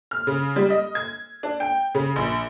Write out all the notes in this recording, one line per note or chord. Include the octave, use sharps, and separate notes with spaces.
F6
C#3
G3
D#5
G#6
D4
G5
C#3
A#1